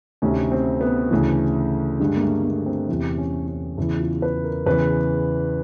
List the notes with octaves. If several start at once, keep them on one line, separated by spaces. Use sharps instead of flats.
D2 C3 D#3 C#4
C4
B3
D2 C#3 E3
G2 D3 G#3
A#3
A3
A#3
C4
E2 C3 E3 C4
C#4
C#4
E2 C#3 E3 E4
F4
B4
A#4
E2 C#3 E3 B4